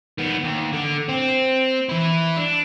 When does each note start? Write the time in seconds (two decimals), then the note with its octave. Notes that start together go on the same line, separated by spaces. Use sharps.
0.18 D#3 B3
0.45 D#2
0.73 D3
1.09 C4
1.89 E3 E4
2.37 D4